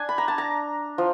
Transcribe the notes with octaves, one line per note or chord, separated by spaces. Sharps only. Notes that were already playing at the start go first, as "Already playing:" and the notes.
Already playing: D4 G#5
B5
A#5
A5
A#5
F3